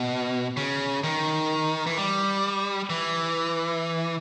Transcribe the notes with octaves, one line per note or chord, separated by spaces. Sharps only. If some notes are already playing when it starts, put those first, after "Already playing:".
Already playing: B2
C#3
D#3
E3
G3
E3